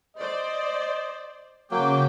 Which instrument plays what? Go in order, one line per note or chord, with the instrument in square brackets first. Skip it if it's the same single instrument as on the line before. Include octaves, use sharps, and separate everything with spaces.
[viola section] C5 D5 [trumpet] D#5
[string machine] C#3 [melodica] F#3 A#3 [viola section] G5 [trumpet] D6